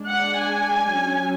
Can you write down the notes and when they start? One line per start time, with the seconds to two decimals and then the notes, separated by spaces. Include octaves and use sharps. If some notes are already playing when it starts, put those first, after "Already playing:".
Already playing: G#3 D4
0.09 F#5
0.39 G#5
0.99 F#3 C#4